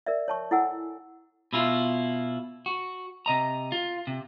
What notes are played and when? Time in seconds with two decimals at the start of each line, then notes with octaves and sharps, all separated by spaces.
0.06 A#4 D5 E5
0.28 C#5 A5 C#6
0.51 E4 A4 F#5 G#5 E6
1.53 B2 E4 F4
2.66 F#4
3.26 C3 D#5 A#5
3.72 F4
4.07 C3